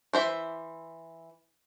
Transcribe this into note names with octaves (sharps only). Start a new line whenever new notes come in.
E3 C5 E5